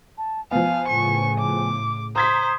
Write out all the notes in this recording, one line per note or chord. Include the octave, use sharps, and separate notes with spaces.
A5
F3 B3 F5 G#5
A2 C#3 C#6
D6
C5 A#5 D#6 G#6 B6